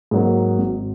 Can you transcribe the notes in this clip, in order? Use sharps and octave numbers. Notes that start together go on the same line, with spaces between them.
G#2 F#3 A#3
G#1